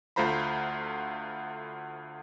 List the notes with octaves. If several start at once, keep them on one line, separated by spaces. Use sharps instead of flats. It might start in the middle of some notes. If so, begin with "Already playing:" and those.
D2 A3 F4 C5 A#5 B5